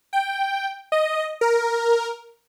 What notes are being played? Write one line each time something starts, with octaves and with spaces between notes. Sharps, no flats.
G5
D#5
A#4